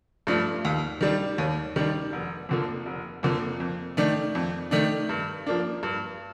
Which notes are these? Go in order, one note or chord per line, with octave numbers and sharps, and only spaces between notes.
G2 F3 A3 D4
D#2
D#3 G3 D4
D#2
D#3 G3 D4
F1
F2 D3 F3 A#3
F1
F2 D3 F3 A#3
F2
D#3 A3 D4
F2
D#3 A3 D4
G2
F3 A#3 D4
G2